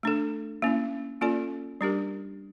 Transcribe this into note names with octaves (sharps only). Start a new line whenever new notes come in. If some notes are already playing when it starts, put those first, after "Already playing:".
A3 D4 A4
A#3 C#4 E4
A#3 C#4 F4 A4 D5
G3 D4 G4 A#4